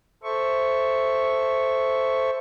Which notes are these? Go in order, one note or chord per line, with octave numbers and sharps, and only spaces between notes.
A4 C5 E5 C#6